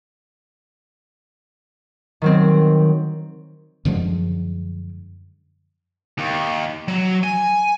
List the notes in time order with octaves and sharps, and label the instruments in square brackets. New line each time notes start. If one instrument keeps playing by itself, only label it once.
[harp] D#3 F#3 C4
[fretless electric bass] F#2 D3 F3 G#3
[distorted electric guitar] D#2
F#3
G#5